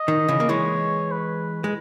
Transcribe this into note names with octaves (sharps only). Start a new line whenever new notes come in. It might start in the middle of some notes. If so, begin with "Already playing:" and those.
Already playing: D#5
D#3
C#3 E3
A#3
E3 G#3 C#5
B4
G#3